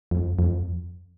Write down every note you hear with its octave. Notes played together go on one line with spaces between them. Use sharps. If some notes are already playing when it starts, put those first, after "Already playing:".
F2
F2